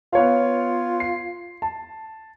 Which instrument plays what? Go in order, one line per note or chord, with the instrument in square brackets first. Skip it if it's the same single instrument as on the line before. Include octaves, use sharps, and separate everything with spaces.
[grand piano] B3 C#5 F5 [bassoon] F4
[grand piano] C7
A5